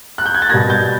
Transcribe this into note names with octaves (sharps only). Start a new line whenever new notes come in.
F#6
G6
G#6
A6
B2 G3 A#3 G#6 A#6
G6 A6